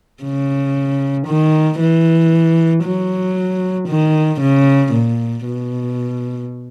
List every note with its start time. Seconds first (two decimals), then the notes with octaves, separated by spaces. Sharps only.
0.23 C#3
1.27 D#3
1.80 E3
2.84 F#3
3.88 D#3
4.41 C#3
4.93 A#2
5.45 B2